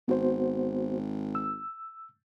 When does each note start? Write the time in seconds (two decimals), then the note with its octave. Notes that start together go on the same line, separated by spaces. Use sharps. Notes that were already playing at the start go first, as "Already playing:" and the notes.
0.08 G#1 B3 F#4 C5
1.35 E6